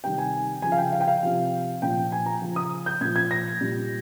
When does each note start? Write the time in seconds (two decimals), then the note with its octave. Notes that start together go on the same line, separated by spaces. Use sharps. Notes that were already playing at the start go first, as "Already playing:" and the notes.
0.04 C3 D#3 G3 G5
0.18 G#5
0.62 C#3 F3 G#5
0.72 F5
0.78 G5
0.93 F5
1.00 G5
1.07 F5
1.23 C3 F3
1.82 A#2 F3 G5
2.12 G#5
2.26 A#5
2.42 C#3 F3
2.56 D#6
2.86 G6
3.01 A#2 F3 G#6
3.16 G#6
3.31 A#6
3.61 A#2 G3